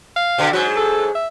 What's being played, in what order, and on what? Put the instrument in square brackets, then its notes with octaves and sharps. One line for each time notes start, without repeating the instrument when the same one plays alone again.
[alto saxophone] F5
[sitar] B2 D3
[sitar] G#2 F#3 [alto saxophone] F#4
[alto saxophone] A4
E5